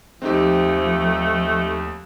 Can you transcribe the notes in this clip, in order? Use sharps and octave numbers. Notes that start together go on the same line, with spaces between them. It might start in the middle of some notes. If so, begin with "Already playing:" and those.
D#2 F3 A3 C4 D#4 G4